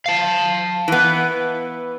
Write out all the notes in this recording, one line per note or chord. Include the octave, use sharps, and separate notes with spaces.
F5 A5
E3 B3